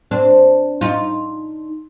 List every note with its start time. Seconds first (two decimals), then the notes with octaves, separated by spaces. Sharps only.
0.11 C4 D4
0.81 D#4 F4